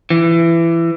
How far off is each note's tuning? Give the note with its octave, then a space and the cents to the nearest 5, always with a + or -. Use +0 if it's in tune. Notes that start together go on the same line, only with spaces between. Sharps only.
E3 +20